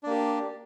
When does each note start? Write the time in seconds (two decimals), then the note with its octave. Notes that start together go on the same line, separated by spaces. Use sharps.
0.03 D4
0.07 A#3
0.10 G4